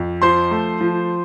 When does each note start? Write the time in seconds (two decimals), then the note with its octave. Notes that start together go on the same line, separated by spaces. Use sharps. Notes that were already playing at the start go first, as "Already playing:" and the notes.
Already playing: F2
0.22 F3 C5 C6
0.51 A3
0.81 F3